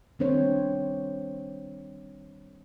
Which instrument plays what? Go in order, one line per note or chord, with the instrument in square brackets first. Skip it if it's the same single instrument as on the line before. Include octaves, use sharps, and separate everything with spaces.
[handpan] D#3 G3 C4 D4 C5 C#5